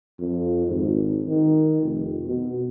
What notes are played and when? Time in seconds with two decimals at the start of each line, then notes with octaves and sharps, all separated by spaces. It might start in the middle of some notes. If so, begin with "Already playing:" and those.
0.19 F2
0.67 G#1
1.28 D#3
1.82 F1
2.27 B2